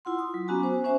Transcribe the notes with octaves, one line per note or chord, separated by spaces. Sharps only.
E4 F4 F#5 C6
D#6
F#3
B3 C#4 F#4 G#5 A#5 D6
C5
C#4 C5 E5 G#5